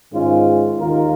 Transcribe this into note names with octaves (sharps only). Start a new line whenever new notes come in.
G#2 D#3 G#3 C#4 F4
D#2 D#3 A#3 F4 A#4